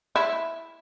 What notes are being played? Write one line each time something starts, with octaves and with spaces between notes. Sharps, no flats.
E4